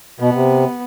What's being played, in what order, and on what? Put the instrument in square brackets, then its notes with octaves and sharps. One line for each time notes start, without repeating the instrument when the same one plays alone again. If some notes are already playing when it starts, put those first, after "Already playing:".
[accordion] B2 [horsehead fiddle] B3
[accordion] C3